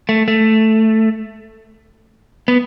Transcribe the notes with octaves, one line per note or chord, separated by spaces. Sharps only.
A3
A3
B3